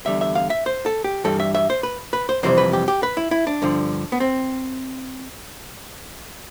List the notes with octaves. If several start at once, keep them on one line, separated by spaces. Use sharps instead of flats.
E2 D3 G3 E5
E5
F5
E5
C5
A4
G4
G2 E3 G3 A4
E5
E5
C5
B4
B4
C5
F2 C3 E3 G3 C5
B4
G4
G4
B4
E4
E4
D4
G2 D3 F3
B3
C4